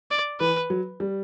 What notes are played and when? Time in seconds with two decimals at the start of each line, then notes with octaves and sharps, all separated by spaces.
0.11 D5
0.40 E3 B4
0.70 F#3
1.00 G3